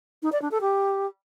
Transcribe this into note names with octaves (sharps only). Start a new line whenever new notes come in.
D#4
D5
D4
A4
G4